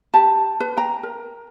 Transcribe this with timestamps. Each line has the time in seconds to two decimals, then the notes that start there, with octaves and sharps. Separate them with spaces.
0.14 G4 A5
0.60 B4
0.77 G5 A#5
1.03 A#4